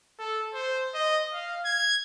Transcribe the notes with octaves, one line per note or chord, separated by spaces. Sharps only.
A4
C5
D#5
F5
G#6